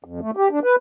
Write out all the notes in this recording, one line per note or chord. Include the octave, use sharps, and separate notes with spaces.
F2
A3
G4
D4
B4